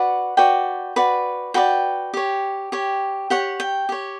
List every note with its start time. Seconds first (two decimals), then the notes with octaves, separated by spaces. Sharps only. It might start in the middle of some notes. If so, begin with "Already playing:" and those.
Already playing: F#4 B4 D5 F#5
0.37 F#4 B4 D5 G5
0.96 F#4 B4 D5
1.54 F#4 B4 D5 G5
2.14 G4 C#5
2.72 G4 C#5
3.30 G4 C#5 F#5
3.60 G5
3.89 G4 C#5